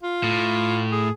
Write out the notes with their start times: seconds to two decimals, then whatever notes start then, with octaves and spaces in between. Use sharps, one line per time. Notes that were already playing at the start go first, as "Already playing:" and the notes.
0.03 F4
0.24 A2
0.92 G#4